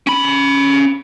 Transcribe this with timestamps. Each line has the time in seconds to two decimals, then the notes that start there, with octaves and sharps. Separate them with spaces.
0.07 C#4 B5